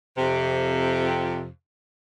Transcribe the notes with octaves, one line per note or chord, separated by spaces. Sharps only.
F2 C3